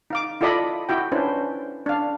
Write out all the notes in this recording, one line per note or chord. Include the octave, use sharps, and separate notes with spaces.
D#4 F5 D6
E4 F4 A4 D5 D#5 B5
E4 F#4 G5
C#4 D4 E4 B4 C5
D4 F5